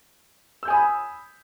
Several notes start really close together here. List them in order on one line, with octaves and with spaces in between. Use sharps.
E6 G6 G#5 D#6 B5